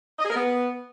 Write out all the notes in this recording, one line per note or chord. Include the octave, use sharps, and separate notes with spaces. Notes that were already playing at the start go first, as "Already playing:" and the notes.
D#5
G#4
A#4
B3